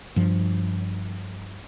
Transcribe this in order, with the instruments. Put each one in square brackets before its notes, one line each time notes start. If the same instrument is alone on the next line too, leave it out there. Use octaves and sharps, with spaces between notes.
[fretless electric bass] G2 F3